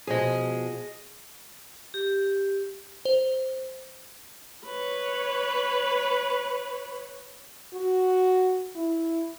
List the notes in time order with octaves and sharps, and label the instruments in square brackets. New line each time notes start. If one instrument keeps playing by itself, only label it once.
[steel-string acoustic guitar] B2 F3 [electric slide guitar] G#4 D#5
[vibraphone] G4
[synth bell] C5
[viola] B4 C#5
[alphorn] F#4
E4